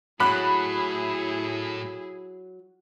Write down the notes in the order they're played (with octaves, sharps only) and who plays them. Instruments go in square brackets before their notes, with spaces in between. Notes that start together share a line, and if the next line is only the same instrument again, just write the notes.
[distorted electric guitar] A2 [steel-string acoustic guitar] F#3 [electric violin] E4 G#4 [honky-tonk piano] B5 F#6